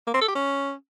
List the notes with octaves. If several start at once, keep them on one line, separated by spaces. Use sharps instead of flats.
A#3
C4
A4
G4
C#4